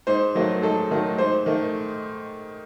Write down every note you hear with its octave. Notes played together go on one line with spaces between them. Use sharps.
G#2 C5
D#3 F#3 A3
G#2 A4
D#3 F#3 A3
G#2 C5
D#3 A3